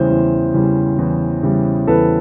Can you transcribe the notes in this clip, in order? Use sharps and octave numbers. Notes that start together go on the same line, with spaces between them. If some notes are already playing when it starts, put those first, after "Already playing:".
Already playing: E2 C#3 E3 G3 C5
E2
C#3 E3 G3
E2
C#3 E3 G3
E2 A4 B4